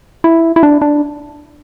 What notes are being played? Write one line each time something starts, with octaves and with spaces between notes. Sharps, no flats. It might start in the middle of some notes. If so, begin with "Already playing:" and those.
E4
E4
D4
D4